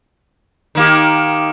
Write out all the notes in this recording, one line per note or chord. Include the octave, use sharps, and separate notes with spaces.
D#3 A#3 G4